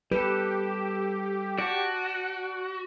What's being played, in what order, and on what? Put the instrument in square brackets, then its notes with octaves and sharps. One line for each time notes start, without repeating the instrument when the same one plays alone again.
[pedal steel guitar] G3 A4 [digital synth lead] G4 [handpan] B4
[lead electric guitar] F#4 [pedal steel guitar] D5 A5